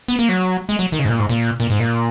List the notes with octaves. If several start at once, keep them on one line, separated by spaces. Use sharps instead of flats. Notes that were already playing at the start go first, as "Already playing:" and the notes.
B3
A#3
F#3
G#3
F#3
D#3
C#3
G#2
A#2
G#2
A#2
A#2
G#2
A#2